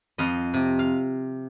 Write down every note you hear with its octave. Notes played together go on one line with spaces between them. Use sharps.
F2 D#5 F5
C3
F5